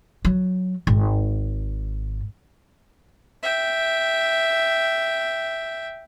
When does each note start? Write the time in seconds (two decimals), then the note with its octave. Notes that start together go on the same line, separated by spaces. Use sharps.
0.25 F#3
0.87 G#1
3.43 E5 G5